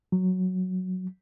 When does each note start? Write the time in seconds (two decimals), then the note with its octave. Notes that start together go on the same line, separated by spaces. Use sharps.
0.12 F#3